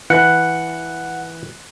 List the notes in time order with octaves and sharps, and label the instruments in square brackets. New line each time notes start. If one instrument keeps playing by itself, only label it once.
[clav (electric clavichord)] E3 [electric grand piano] F#5 F#6 C#7